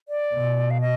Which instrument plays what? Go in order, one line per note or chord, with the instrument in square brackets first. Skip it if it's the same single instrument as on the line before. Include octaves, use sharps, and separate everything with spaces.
[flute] D5
[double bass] B2
[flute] F5
D#5